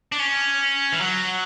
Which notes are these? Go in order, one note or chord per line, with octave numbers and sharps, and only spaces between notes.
D4
C#4
E3
F#3